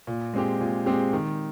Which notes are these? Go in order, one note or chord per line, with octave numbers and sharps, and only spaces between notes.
A#2
G#3 C4 G4
A#2
G#3 C4 G4
D#3